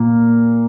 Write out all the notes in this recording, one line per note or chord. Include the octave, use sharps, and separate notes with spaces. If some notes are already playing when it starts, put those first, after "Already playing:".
Already playing: A#2 A#3